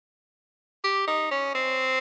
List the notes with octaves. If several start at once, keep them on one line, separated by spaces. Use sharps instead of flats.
G4
D#4
C#4
C4